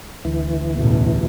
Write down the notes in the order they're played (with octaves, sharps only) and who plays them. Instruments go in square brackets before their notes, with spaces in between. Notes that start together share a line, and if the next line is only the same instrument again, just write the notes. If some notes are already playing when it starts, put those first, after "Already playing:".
[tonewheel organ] D2 E3
[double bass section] A1 E2 B2